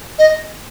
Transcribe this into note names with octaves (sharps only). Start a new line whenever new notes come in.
D#5